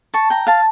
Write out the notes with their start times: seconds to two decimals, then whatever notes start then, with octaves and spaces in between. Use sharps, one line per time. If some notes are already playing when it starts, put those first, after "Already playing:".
0.14 A5 C#6
0.30 G5 A#5
0.47 F5 A5